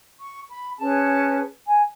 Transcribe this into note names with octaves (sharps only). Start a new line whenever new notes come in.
C#6
B5
C#4 G#4 B4 A5
G#5